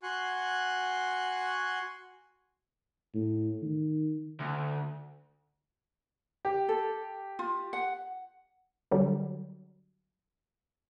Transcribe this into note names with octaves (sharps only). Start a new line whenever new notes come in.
F#4 F#5 G#5 C6 F#6
A2
D#3
D2
G4
A4
F4
F#5
D3 F#3 G3